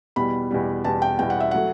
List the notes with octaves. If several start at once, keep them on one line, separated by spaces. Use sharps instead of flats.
E2 B2 G3 B5
E2 B2 G3
E2 B2 G3 A5
G5
E2 B2 G3 G5
F#5
E5
F#3 A3 F#5